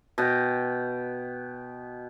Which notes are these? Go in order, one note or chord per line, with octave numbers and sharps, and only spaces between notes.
B2 G5